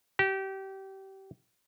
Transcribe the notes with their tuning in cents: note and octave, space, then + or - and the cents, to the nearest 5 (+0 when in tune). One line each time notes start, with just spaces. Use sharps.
G4 -25